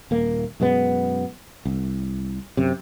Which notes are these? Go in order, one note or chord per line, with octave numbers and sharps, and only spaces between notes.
D#1 A#3
F#2 B2 G#3 B3
C2
F#2 C3